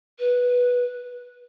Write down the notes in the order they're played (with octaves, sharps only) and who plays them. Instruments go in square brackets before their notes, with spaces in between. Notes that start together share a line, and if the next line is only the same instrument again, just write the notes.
[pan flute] B4